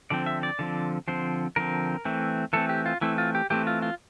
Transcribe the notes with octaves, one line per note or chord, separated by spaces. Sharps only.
D3 F3 C4 D5
E5
D5
D3 F3 C4
D3 F3 C4 C5
D3 F3 C4 A#4
E3 A3 C4
E3 A3 C4 A4
G4
F4
E3 A3 C4 E4
F4
G4
E3 A3 C4 G4
F4
F4